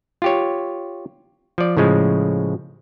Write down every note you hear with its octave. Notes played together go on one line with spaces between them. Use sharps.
F4 G4 C#5
F3 D5
A2 C#3 F3 G#3